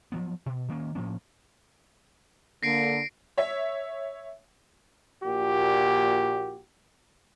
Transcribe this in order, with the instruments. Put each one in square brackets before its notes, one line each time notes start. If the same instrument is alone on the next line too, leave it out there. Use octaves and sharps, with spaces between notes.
[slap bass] F3 F#3 B3
B2
D#3 A3 A#3 C#4
A2 F3 A#3 C#4
[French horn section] D3 A#3 [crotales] A#6 C7 D7
[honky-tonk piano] C#5 E5
[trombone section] A#1 A#2 F#4 G4